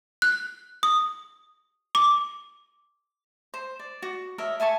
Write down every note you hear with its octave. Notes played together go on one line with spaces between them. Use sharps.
F#6
D#6
D6
C5
D5
F#4
A#4 C#5 D#5 E5
E5 G#5 A5 C#6